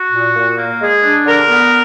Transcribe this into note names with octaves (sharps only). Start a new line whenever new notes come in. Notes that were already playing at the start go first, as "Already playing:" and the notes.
Already playing: F#4
A#2
A#2
A#3
G#3 G#4
D4
D3 A#4
B3